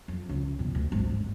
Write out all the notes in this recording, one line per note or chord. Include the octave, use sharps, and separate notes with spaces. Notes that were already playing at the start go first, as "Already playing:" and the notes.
F2
C#2
E2 B2
D2
G#1 F#2
G1 G#3